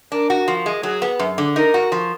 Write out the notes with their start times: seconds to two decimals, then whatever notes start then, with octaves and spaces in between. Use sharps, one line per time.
0.12 D4 A#4
0.30 F#4
0.48 F3
0.66 G#3
0.83 F#3 G#4
1.02 B3
1.19 F#2
1.38 D3
1.56 D#4 A#4
1.74 F#4
1.92 F3